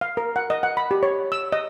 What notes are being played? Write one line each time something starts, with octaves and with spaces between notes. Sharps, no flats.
F5
A#4
F#5
D#5
F#5
B5
G4
C#5
E6
D#5